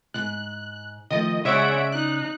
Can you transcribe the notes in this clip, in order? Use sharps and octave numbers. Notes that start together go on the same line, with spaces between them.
D#2 G#2 F#6
D#3 F3 A3 D#5
C#3 G#3 C#5 D5 E5 F#5 D7
D#4 F#6